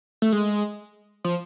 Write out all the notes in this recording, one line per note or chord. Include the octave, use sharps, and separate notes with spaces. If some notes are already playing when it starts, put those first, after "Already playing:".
A3
G#3
F3